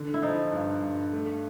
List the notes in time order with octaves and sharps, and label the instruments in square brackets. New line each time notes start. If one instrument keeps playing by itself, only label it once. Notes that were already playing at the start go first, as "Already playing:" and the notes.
Already playing: [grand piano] D3
[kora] E4
[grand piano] F3 [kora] D#4
[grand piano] G2
G2
A3